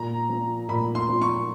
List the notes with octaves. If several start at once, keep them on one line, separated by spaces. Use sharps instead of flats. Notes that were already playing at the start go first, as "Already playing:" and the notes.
Already playing: A#2 A#5
F3
A#2 B5
C6
F3
C#6